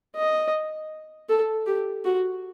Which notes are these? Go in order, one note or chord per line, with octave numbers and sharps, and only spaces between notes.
D#5
A4
G4
F#4